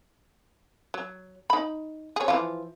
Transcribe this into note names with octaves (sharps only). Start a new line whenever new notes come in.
F#3
D#4 B5
G#4 C#5
E3 F3 F4